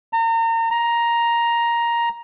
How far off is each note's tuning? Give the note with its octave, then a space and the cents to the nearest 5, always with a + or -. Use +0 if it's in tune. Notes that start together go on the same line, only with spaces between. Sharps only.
A#5 -35
A#5 +10